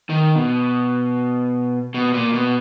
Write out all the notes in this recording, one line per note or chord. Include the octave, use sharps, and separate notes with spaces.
D#3
B2
B2
A#2
B2